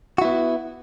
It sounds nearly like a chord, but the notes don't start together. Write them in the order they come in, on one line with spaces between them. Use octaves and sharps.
F#4 E4 B3